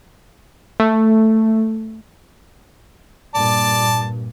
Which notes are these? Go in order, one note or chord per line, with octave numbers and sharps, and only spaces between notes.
A3
G2 A#2 D5 A5